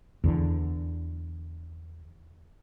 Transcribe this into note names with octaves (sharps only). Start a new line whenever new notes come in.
E2 D3